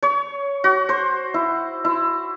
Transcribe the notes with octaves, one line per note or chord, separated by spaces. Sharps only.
C#5
F#4
C5
E4
E4